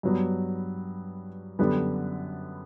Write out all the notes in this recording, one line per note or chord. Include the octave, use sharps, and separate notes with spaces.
G2 F#3 B3
F#2 D3 G3 B3 D4